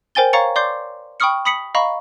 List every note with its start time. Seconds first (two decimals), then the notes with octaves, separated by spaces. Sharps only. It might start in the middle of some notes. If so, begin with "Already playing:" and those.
0.15 A#4 C5 G5 G#5 A6 G7
0.33 C#5 F5 A#5 C#6 A6 C#7
0.56 D5 C6 D6 G6 C7
1.20 G5 B5 C#6 D#6 F6 C#7
1.45 B5 D#6 B6 C#7 F#7
1.75 D#5 F5 A#5 B5 C#6